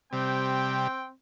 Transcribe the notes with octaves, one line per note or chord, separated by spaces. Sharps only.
C3 G3 C4 G5